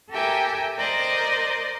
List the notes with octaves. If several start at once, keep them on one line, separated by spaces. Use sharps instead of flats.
G4 A4 A#4 E5 G5 G#5
A#4 C5 D5 D#5